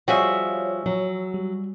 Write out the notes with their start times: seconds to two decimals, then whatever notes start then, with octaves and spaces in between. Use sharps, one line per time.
0.08 F3 G3 F#4 G#4 C#5 E5 F5
0.86 F3 F#3
1.34 G3